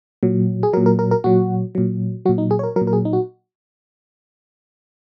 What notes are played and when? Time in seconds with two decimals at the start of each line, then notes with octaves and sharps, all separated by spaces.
0.23 A#2 F#3
0.63 G#4
0.73 F#3 A#4
0.77 A#2
0.86 A#4
0.99 A#4
1.11 A#4
1.24 A#2 F#3 F#4
1.75 A#2 F#3
2.25 F#3 F#4
2.29 A#2
2.38 D#4
2.51 G#4
2.59 C#5
2.63 A#4
2.76 F#3 A#4
2.81 A#2
2.87 A#4
2.93 G#4
3.05 D#4
3.13 F#4